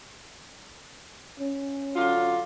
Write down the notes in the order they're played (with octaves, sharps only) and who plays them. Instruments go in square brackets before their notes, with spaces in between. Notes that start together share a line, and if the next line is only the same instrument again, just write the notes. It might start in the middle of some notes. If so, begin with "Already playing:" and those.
[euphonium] C#4
[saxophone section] D3 F#3 F4